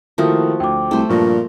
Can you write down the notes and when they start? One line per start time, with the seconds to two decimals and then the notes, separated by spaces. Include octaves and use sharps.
0.18 D#3 F3 A3 A#3 E4 F#4 D#6
0.60 D2 G5 D6
0.91 C2 A3 C5
1.09 G2 A#2 F3 C#6 A#6